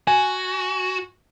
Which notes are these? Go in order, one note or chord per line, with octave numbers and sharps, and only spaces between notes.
F#4 G#5